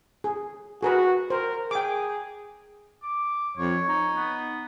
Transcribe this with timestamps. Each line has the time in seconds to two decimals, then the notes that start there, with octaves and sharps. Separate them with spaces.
0.24 G#4
0.83 F#4 G#4 A#4 B4
1.30 A#4 C5
1.71 G#4 G5 D6
3.03 D6
3.57 F2 C#5
3.88 D#4
4.16 B3